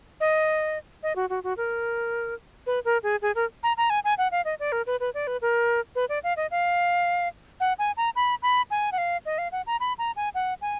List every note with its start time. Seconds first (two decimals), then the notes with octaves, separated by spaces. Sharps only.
0.20 D#5
1.03 D#5
1.16 F#4
1.30 F#4
1.44 F#4
1.57 A#4
2.66 B4
2.85 A#4
3.03 G#4
3.22 G#4
3.35 A#4
3.63 A#5
3.77 A#5
3.90 G#5
4.04 G#5
4.18 F#5
4.32 F5
4.45 D#5
4.60 D5
4.72 A#4
4.86 B4
5.00 B4
5.14 D5
5.27 B4
5.42 A#4
5.95 B4
6.09 D5
6.24 F5
6.37 D#5
6.51 F5
7.60 F#5
7.79 G#5
7.97 A#5
8.16 B5
8.43 B5
8.71 G#5
8.92 F#5
8.98 F5
9.26 D#5
9.38 F5
9.52 F#5
9.67 A#5
9.80 B5
9.98 A#5
10.16 G#5
10.35 F#5
10.62 G#5